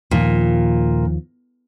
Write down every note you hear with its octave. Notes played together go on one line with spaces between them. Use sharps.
D#2 A#2 D#3 F3